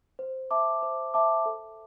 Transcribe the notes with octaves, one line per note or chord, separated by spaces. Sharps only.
C5
E5 A5 D6
C5
E5 A5 D6
A4